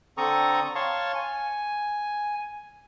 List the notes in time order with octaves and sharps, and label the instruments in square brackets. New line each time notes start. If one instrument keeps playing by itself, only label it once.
[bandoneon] D3 C4 A4 A#5 C#6 D#6
C#5 F5 A5 C6 C#6
G#5